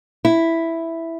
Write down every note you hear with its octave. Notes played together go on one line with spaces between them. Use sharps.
E4